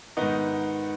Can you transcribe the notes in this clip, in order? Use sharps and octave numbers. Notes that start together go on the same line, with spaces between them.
G#2 D#3 B3 D#4